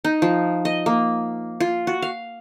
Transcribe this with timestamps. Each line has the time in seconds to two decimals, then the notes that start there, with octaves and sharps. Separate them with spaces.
0.05 D#4
0.22 F3
0.65 D#5
0.86 A#3
1.60 F4
1.87 F#4
2.02 F5